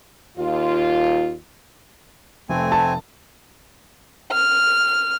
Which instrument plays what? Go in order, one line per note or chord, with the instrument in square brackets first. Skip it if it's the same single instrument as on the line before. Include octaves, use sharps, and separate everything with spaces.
[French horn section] D#2 F4
[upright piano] F1 [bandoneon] A3 C4 G#5
[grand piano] A5
[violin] F6